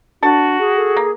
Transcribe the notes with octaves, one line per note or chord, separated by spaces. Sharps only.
D4 F#4 A4 A5
G#4
A4
A#3